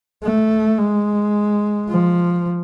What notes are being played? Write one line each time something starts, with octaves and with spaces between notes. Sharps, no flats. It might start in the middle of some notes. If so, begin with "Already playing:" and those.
A3
G#3
F3